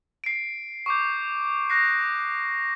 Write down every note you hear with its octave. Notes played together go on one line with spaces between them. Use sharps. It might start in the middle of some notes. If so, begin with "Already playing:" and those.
C7 D7
C#6 D6 G6
D#6 F#6 A#6 C7